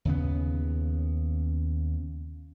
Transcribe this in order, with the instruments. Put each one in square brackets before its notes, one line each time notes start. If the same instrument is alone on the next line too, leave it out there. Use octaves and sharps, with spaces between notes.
[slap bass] D#2 C#3 B3